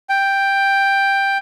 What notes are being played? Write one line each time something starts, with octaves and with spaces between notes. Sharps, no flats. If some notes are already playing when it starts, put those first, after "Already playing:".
G5